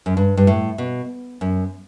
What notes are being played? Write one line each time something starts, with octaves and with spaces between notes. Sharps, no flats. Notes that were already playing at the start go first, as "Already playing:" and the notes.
F#2
G2
G2
A2
B2
F#2